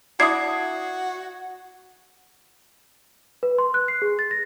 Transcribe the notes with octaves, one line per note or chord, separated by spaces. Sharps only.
D4 E4 F#4 D#6 G#6 C7
B4
C6
F#6
C7
G#4
A6
A#6